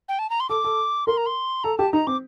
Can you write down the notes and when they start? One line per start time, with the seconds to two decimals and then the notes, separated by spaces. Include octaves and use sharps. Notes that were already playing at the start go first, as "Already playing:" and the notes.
0.09 G5
0.19 A5
0.30 A#5
0.40 C6
0.49 A4 D6
0.64 A4
1.07 A#4 C6
1.17 A#5
1.26 C6
1.64 A4 A#5
1.78 G4 A5
1.93 D#4 A#5
2.07 C4 D6